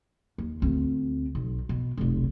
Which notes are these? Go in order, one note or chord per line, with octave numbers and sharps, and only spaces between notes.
D#2
D2 C4
B1
B2
F1 B1